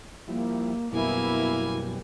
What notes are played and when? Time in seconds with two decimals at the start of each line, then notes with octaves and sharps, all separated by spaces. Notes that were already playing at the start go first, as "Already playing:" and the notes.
0.28 F3 G3 A#3 E4
0.93 F#2 B2 G3 A#3 B3 E4 G#5